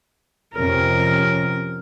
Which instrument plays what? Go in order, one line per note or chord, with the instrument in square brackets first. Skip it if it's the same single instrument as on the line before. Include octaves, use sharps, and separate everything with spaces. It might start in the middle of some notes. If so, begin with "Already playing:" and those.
[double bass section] F2 C3 C#4 [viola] A#4